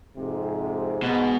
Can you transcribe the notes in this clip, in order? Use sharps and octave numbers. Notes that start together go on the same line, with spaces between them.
F2 G#2 C3
G#2 B2